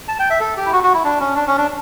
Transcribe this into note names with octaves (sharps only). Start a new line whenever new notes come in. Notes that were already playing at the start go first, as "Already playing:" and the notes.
A5
G5
E5
A4
G4
E4
F#4
F#4
E4
D4
C#4
D4
C#4
D4